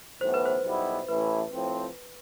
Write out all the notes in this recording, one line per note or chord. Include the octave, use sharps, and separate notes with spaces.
B1 A2 E3 B3 C5
B4
C5
B1 B2 G3 B3 E4
A1 A2 E3 A3 E4 B4
A2 F3 C4